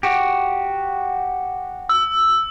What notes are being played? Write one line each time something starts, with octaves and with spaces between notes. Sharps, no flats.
F#4 G4
E6